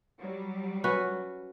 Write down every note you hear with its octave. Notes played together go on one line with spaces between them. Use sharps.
F#3 G3
C#4 F#4 B4